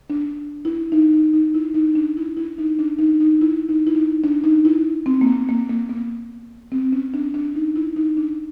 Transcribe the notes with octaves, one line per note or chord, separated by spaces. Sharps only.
D4
E4
D#4
D#4
D#4
E4
D#4
D4
E4
E4
D#4
D4
D#4
D#4
E4
D#4
E4
D#4
D4
D#4
E4
C4
A#3
B3
A#3
A#3
B3
C4
C#4
D4
D4
D#4
E4
D#4
D4